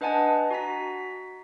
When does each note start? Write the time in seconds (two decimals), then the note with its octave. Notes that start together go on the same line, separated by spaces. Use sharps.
0.01 D4 B4 D#5 F#5 G#5 A5
0.51 F#4 A#5 B6